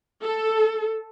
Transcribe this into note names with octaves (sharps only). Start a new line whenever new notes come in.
A4